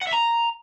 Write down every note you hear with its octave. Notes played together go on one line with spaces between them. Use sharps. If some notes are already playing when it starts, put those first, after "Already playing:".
F#5
E5
A#5